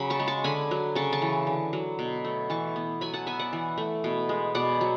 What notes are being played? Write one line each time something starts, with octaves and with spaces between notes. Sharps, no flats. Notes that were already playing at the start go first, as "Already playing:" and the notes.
Already playing: C#3 F#3 B5
A5 C#6
G#3
A5 C#6
D3 G#5 B5
F#3
C#3 A5 C#6
A5 C#6
E3
D3
F#3
B2
A3
E3 A5 C#6
B3
F#3 G#5 B5
F#5 A5
B3 E5 G#5
D5 F#5
E3
A3
B2
G#3
B2 D5 F#5
F#3